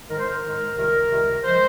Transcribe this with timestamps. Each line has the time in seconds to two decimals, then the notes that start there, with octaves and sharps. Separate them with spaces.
0.08 G#2 D#3 G#3 A#4
0.18 C5
0.28 A#4
0.43 G#2 D#3 G#3
0.76 C#2 C3 D#3 G3 A#4
1.10 C#2 C3 D#3 G3
1.44 F3 G#3 C5